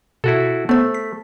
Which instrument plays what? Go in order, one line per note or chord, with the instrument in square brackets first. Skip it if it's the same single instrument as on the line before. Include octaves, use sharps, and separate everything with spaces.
[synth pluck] B2 [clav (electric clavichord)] E4 F#4 A4
[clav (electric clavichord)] A3 [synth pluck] B3 C5
[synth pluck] B6